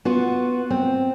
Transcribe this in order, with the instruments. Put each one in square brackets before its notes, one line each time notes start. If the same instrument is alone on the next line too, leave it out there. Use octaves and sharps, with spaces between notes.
[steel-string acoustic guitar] B3 F4 F#4
C4